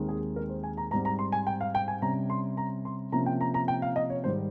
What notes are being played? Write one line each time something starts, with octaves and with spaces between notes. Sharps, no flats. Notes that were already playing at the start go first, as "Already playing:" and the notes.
Already playing: D#2 D#3 G#3 C4
G#4
A#4
C5
G#5
A#5
G#2 G3 C4 A#5
A#5
C6
G#5
G5
F5
G5
G#5
C3 G3 C#4 A#5
C6
A#5
C6
C3 F3 A#3 C#4 A#5
G5
A#5
A#5
G5
F5
D#5
C#5
G#2 D#3 G3 C5